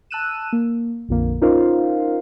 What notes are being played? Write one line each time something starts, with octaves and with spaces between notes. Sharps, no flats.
A5 E6 F#6 D#7 E7
A#3
A#1 F2 A#2 D3 A#3
C#4 D#4 F4 A#4 C5 F5